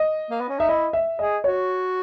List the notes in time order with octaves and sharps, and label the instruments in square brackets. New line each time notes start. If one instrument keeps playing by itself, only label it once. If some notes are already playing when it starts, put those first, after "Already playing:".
Already playing: [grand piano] D#5
[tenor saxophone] A#3
B3
C#4
[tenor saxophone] D#4 [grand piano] E5
[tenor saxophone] E4 [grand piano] D#5
[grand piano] E5
[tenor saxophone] G#4 [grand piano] D#5
[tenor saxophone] F#4 [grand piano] C#5